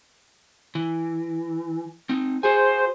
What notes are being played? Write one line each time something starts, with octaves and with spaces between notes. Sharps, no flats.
E3
C4 D#4
F#4 G#4 C5 G#5